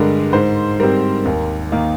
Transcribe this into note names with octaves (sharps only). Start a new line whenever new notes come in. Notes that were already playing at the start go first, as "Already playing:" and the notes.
Already playing: G2 D3 G#3 A#4
G#2 C5
G3 C4 A#4
D#2
D#3 A#3